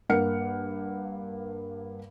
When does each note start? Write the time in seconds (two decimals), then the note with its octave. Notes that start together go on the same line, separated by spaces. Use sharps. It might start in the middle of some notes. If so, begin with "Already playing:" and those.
0.09 G2 A#3 A#4 F#5 F6 C#7